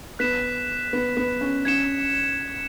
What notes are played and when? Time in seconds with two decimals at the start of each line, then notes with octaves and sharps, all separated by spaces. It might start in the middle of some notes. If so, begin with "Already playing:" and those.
0.19 B3 F#6 B6 E7
0.93 B3
1.17 B3
1.41 C#4
1.65 C#4 G#6 C#7 E7